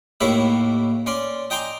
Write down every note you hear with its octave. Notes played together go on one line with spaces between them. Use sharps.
D#2 A2 A#3 E4 C#5 E5
C#4 D5 C6
D#5 G5 G#5 A#5 C6 D6